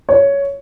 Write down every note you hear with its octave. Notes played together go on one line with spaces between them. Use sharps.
C#5